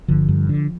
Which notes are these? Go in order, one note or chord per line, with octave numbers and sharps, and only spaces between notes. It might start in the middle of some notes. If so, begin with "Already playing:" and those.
G1 D3 F3
G2
D3